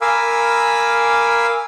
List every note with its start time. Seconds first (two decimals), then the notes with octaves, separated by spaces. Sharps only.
0.01 A#4 F5 G#5 B5 D6 E6